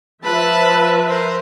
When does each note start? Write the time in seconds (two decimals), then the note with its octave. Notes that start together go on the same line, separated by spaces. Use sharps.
0.23 F3 B4 E5 A5 B5
1.08 A#4 C5